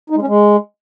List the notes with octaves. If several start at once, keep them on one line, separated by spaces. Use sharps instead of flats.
D#4
G#3
C#4
G#3